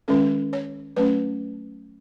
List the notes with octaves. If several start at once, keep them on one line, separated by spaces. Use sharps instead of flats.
D#3 G#3 C#4 A4
C#5
F#3 A3 C#4 B4